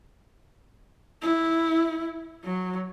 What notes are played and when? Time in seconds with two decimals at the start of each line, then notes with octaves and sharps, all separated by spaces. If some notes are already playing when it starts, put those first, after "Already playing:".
1.22 E4
2.44 F#3